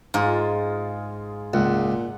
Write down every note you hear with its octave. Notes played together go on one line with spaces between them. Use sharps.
G#2 F4 G#4
C#2 A#2 F#5